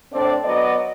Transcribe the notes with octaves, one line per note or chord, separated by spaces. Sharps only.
A2 C4 D4 D5
F#3 B3 D5 D#5